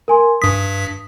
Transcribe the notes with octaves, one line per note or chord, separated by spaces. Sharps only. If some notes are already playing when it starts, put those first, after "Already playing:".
A#4 G#5 C6
G2 D#6 B6